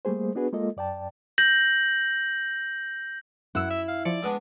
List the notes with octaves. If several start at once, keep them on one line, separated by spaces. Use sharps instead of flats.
G3 A3 A#3 G#4 C5
B3 D4 F#4 G#4 B4
G#3 A#3 F4 A4 D#5
F#2 D5 G5 A5
G6 A#6 F#7
F#2 E4 F#5 E6
E5
F5
F3 D5 C#7
G#3 B3 D4